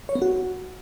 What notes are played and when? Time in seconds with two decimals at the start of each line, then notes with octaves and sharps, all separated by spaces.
0.09 C#5
0.15 B3
0.22 F#4